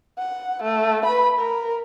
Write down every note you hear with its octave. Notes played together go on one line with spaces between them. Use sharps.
F#5
A3
B4 B5
A#4